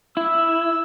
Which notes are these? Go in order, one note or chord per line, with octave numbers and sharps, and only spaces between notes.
E4 E6